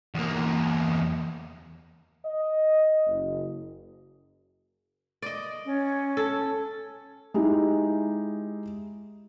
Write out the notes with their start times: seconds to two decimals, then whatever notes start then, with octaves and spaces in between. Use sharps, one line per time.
0.15 E2 A#3
2.24 D#5
3.06 F#1
5.22 D5 D#5
5.65 C#4
6.17 A4
7.34 G#3 D#4 E4 G4